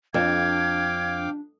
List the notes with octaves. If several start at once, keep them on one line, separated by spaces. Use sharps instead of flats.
F2 D4 F5 G5 D6 G#6